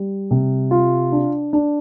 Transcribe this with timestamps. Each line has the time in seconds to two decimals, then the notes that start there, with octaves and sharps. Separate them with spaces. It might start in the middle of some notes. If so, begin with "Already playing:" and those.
Already playing: G3
0.31 C3
0.71 F4
1.12 D4
1.53 D4